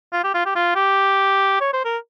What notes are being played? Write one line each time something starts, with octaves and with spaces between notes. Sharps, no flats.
F4
G4
F4
G4
F4
G4
C#5
C5
A#4